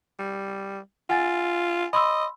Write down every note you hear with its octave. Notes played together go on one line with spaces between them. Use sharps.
G3
F4 F#5 G#5 A6
D#5 B5 C6 E6